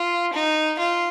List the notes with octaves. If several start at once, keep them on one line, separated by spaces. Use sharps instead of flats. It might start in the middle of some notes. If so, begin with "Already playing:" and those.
Already playing: F4
D#4
F4